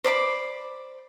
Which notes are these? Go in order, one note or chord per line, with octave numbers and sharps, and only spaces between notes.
C5 D5 B5 D6